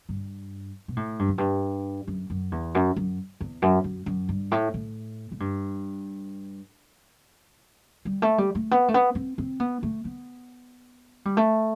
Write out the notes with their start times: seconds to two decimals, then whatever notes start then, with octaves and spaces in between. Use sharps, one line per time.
0.09 G2
0.88 B2
0.97 A2
1.19 G2
1.28 F#2
1.38 G2
2.07 F#2
2.30 F#2
2.52 E2
2.75 F#2
2.96 F#2
3.41 E2
3.62 F#2
3.84 F#2
4.06 F#2
4.29 G2
4.52 A2
4.74 A2
5.32 A2
5.40 G2
8.05 G3
8.22 A3
8.38 G3
8.55 A3
8.71 B3
8.88 A3
8.94 B3
9.15 C4
9.38 C4
9.60 B3
9.83 A3
10.05 B3
11.25 G3
11.37 A3